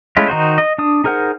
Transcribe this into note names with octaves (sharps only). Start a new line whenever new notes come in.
G#3 A3 C#4 E4 F4
D#3 D#4 F#4 C5
D#5
D4 D#6
D#4 G#4 A#4 C5 F#5